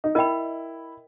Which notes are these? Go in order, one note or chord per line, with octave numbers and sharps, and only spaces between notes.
D#4
E4 A#4 D#5 G5 B5